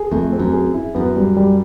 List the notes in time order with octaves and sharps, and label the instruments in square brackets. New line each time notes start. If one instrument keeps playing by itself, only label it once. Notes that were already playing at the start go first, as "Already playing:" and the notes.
Already playing: [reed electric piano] G#4
[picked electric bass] F2 [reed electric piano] A3
[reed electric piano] C4
[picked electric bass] F#2
[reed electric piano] G#4
E4
[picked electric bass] F#2 [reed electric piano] B3
[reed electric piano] G3
G3